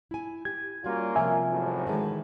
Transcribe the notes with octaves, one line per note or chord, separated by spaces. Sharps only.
E4 G#5
G4 G#6
G3 A#3 C#4 F4 F#4
C3 F3 A#4 E5 G#5
G#1 F#2 A2
D#3 E3 G#3